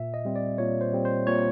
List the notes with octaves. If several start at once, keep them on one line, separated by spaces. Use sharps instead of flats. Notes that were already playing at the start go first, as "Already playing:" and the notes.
Already playing: A#2 E5
D#5
G3 C4
D5
A#2 C#5
C5
G3 C4
C5
A#2 C#5